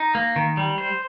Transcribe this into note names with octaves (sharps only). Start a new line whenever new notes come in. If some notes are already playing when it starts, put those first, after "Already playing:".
Already playing: D#4
A#3
D#3
G3
C5